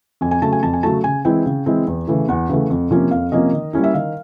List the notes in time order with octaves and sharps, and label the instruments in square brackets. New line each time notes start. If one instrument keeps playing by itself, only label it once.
[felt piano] F2 G#5
G#5
C#3 F#3 A3 A5
G#5
F2 A5
G#5
C#3 F#3 A3 A5
C#3 G#5
E3 G#3 C4 E4 G5
C#3
E3 G#3 C4 E4
E2
C#3 E3 A3
E2 F#5
C#3 E3 A3
F2
C3 F3 A#3 C#4
F2 F5
C3 F3 A#3 C#4 D#5
D#3
G3 A#3 C#4 E4
E5
D#3 F5